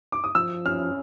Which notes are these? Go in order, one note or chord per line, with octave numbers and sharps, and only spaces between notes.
D6
D#6
F3 E6
C#4 F6